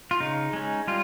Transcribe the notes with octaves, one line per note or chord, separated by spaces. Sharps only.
F4
C#3 D#4
G#3 C#4
G3 F4